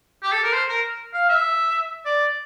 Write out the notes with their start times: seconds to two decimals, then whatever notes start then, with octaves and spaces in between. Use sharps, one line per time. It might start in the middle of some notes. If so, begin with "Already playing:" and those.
0.23 G4
0.32 A4
0.43 A#4
0.53 C5
0.69 A#4
1.14 F5
1.29 E5
2.05 D5